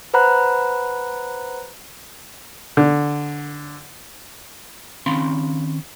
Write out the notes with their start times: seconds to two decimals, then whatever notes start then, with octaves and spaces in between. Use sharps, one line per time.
0.14 B4 C5 F#5 A#5 B5 F#6
2.77 D3
5.06 D#3 C4 C#4 F5 B5 C6